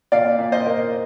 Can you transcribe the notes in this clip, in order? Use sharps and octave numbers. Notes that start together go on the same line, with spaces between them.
A#2 D5 F5
A#2
C5 D#5
A#3